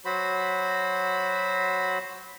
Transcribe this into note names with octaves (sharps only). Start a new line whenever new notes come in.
F#3 F#4 C5 B5